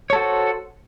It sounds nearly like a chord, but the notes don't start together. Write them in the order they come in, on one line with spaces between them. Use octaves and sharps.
C#5 A4 F#4 C5